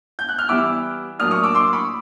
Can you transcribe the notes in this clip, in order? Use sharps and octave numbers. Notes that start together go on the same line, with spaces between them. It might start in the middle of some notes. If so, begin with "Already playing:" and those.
G6
F#6
F6
E3 G3 B3 E4 D6 E6
A2 F#3 A#3 D4 D#6 F6
C#6 D#6
D6 E6
C6 D6
B5 C#6